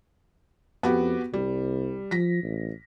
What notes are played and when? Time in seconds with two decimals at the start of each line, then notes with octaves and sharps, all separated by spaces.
0.83 F2 B3 F#4 G4
1.34 C2 G3
2.11 F3 A#6 B6
2.43 A1